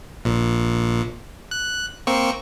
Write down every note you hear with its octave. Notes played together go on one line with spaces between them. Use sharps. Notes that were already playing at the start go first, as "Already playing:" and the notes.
A#1 A#2
F#6
A#3 C4 C#6